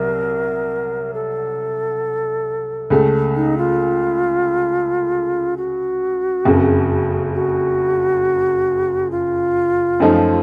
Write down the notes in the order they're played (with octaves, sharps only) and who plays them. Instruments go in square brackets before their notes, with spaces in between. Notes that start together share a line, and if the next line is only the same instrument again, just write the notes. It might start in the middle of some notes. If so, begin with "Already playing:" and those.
Already playing: [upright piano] C2 F#3 [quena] A#4
[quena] A4
[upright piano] C#2 C#3 A3
[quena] D#4
F4
F#4
[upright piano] F#1 F2 C#3
[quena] F#4
F4
[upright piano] F#2 F3 A3 D#4